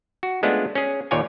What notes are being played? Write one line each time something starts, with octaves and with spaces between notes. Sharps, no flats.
F#4
G#3 A3 B3 C#4 D4 F4
C#4 G#4
D#2 A#2 C#5 D5 F5 G#5